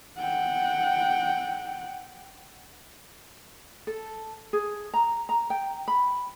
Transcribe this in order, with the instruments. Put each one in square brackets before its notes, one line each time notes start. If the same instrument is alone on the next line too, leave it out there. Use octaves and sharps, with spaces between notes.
[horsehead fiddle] F#5 G5
[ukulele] A4
G#4
A#5
A#5
G5
B5